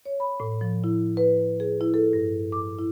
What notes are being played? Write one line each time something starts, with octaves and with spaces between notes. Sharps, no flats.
C#5
B5
A2
F3
E4
B4
G#4
E4
A4
G2
D6
E4